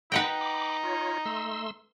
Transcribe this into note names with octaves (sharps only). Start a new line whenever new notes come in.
D#4 B4 D#5 F#5 G5 A#5 B5
B5 D6
F4 C#5
A3 C6 E6